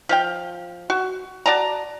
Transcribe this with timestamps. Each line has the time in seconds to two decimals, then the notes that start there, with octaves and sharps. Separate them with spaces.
0.09 F3 F5 G5
0.90 F#4
1.46 F#4 D5 A5 A#5